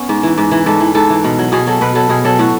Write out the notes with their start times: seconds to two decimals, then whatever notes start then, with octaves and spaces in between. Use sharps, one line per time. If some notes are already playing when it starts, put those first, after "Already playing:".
Already playing: B3 C#4
0.09 G#2
0.23 E3
0.38 G#2
0.51 E3
0.66 G#2 A4
0.80 E3
0.95 G#2 A4
1.10 E3
1.24 B2
1.39 F#3
1.52 B2 G#4
1.67 F#3 A4
1.81 B2 B4
1.95 F#3 A4
2.09 B2 G#4
2.24 F#3 A4
2.39 A2 F#4